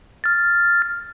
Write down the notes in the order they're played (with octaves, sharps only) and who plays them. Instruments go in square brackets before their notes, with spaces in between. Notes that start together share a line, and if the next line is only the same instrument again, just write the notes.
[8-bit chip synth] F6 A6